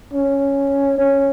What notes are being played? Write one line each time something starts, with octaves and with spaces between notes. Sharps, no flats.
C#4
C#4